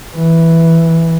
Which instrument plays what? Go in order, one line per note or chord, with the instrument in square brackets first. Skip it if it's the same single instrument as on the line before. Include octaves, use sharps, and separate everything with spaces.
[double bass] E3